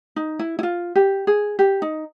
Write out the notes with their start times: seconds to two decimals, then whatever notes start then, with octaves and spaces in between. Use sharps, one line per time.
0.16 D#4
0.39 E4
0.59 E4
0.63 F4
0.95 G4
1.27 G#4
1.59 G4
1.82 D#4